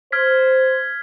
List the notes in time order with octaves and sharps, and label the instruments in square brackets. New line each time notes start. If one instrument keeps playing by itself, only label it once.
[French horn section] C5 [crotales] F6 G#6 B6